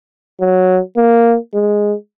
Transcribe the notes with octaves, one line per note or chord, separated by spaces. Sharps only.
F#3
A#3
G#3